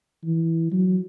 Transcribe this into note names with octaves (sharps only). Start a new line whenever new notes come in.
E3
F#3